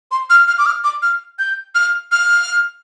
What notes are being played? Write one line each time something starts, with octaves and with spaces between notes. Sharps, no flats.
C6
F6
F6
D6
F6
D6
F6
G6
F6
F6